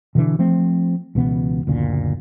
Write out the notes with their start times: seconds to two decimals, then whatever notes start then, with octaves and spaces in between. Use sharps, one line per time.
0.15 B2 D3 E3 D4
0.39 F3 A3 C4
1.15 C#2 B2 E3 B3
1.67 F#1 D2 A#2